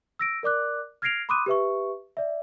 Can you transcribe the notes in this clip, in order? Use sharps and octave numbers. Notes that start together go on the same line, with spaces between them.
E6 A#6 D7
A#4 D5 D6 F#6
F6 G#6 A#6 C7 D7 F7
B5 C6 D6 D#6 F#6 D#7
G4 B4 E5 C#6
D5 E5